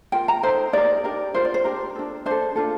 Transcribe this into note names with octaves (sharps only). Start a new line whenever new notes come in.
F4 A#4 G5
A#5
D#4 A4 C5
D#4 G4 A#4 D5
D4 G4 A#4
F4 A#4 C5
D5
C5
D4 G4 A#4
D4 A4
D4 A4 C5
D4 F4 A4